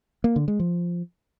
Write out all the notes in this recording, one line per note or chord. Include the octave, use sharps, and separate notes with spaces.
A#3
D3
G#3
F3